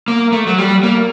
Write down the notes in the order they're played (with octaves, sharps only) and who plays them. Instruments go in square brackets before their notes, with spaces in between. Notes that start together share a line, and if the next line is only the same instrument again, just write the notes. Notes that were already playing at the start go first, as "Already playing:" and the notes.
[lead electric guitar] A#3
A3
F#3
G3
A#3